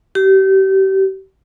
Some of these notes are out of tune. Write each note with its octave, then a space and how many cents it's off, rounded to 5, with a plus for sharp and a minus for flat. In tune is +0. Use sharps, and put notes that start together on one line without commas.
G4 -30